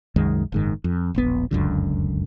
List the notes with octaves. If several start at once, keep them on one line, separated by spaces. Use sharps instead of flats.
C2 F#2 D#3 G#3
F#1 G#2 D#3
F2
E1 A#1 B3
F1 C#2 F#2 D3